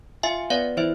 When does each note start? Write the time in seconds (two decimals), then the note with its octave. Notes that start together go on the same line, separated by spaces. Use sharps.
0.23 F4 E5 G#5
0.50 B3 D5 F5
0.77 E3 C5 E5